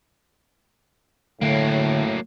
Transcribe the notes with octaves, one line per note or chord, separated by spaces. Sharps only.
A2 D3 F#3 A3 A#3